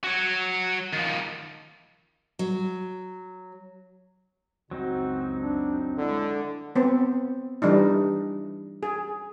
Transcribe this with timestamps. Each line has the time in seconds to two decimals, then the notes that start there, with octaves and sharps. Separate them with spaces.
0.04 F#4 C#5
0.93 D#3 F3
2.39 F#3
4.71 C#2 F#2 F#3 C4 D#4 F#4
5.41 D4
5.98 D3 G#3 E4
6.76 B3 C4
7.62 E3 G3 D4 D#4
8.83 G#4